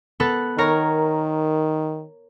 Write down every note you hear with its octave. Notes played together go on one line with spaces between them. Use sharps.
B3 A4 B4
D#3 A#4 C#5 A#5